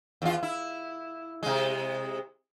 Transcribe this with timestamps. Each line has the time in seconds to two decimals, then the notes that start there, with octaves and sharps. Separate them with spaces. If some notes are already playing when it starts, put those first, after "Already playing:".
0.22 E2 F4
0.43 E4
1.43 C3 G#3